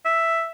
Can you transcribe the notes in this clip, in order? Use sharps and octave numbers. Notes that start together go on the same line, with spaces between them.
E5